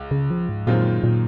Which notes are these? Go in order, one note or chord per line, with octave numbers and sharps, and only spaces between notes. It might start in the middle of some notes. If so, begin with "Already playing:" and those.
Already playing: C#2
C#3
F3
G#2
F#2 A#2 D#3 G#3 C4 F4
A#2